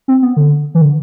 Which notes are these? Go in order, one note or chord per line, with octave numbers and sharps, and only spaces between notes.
C4
B3
D3
E3
D3